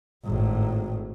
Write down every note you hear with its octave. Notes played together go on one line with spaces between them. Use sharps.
G#1 A2